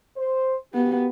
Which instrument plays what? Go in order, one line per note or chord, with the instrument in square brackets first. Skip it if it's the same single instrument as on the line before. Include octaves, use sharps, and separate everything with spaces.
[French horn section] C5
[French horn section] A#3 F#4 G4 [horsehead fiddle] B3